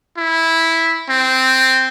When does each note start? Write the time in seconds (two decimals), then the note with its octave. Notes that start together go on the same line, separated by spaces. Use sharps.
0.17 E4
1.09 C4